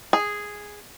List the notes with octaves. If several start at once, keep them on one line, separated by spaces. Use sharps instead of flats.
G#4